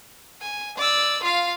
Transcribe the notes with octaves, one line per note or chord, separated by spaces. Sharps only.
G#5
D5 E6
F4 F5